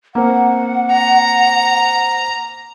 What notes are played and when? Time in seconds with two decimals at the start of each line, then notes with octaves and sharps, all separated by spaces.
0.15 A#3 C4 F#5
0.92 A#5